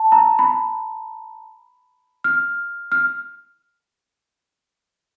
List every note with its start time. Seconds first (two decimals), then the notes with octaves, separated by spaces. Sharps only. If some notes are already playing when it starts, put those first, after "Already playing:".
Already playing: A5
0.12 A#5
0.39 B5
2.24 F6
2.92 F6